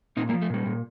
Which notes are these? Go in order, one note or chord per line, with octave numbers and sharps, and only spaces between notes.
A#2 C4 D#4
G3 A#3
F3
A3
A#2 G3
A#2